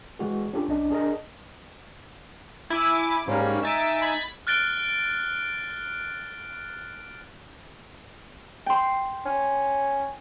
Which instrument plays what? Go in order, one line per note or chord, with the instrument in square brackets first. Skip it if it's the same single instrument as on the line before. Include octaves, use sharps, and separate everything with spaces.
[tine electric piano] E3 G#3 F#4 G#4
C#4 D4 F4 G4 A4
B1 C#4 D4 D#5
D4 G#4 A#4 D#5
[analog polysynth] E4 D6 [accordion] G#5
[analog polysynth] G#2 [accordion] G3 A#3 C#4
[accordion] D#4 E5 G#5 [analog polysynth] E6 A6 D7
[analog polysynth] B5 G#6 A6
[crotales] F6 F#6 A6 D7 G7
[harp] G5 C6
[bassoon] C#4